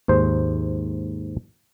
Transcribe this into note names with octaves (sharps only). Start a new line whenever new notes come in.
D#2 G#2 C5